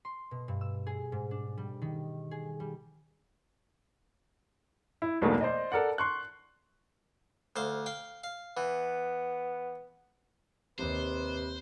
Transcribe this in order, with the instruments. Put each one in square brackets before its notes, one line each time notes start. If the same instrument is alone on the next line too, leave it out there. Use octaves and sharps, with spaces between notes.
[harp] C6
B2
G2
E6
G#4
G#2
D4
G3
D#3
G#4
G3
[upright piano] E4
B1 E2 B2 A3 A#3
C5 D5 D#5
A4 A#4 D5 F#5
C6 C#6 F#6
[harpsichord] D2 C5 F5
F5 G5
F5
[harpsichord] E3 [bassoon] B3
[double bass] D#2 [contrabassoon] C3 [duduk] B4 [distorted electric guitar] C5